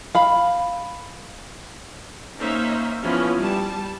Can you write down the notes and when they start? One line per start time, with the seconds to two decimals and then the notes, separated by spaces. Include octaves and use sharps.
0.15 F5 B5
2.38 A#3 C#4 D#4 C5 E5
3.02 E3 F3 B3 C#4 E4 F4
3.39 G3 A5